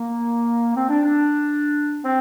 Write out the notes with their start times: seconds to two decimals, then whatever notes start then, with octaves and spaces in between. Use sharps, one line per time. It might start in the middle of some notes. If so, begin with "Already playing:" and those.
Already playing: A#3
0.75 C4
0.89 D4
1.04 D4
2.05 C4